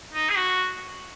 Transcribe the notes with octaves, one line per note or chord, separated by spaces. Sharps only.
D#4
G#4
F#4